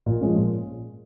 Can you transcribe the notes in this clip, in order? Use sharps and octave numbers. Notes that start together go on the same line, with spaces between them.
A#2
F3 G#3 C#4
A#2